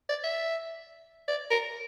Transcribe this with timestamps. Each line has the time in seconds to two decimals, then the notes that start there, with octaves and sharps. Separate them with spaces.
0.09 D5
0.24 E5
1.28 D5
1.51 A#4